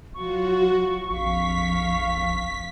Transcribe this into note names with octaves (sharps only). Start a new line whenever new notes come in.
F#3 F4 F#4 C#6
A#1 F2 F5 B6